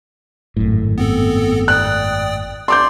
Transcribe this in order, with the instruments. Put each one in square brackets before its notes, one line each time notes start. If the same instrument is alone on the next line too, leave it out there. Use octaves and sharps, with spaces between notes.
[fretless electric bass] G#1 F#2 A2
[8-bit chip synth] B3 C4 A4
[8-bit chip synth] D5 G5 D#6 [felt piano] F#6
[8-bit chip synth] D5 [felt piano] C6 D6 G6